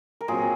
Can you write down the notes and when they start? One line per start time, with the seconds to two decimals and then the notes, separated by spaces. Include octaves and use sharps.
0.21 A#4
0.28 A#2 F#3 C4 F4 G#4